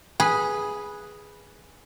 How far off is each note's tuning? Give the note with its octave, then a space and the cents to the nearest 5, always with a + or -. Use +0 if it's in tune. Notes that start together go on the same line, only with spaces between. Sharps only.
G#4 +0 B4 -10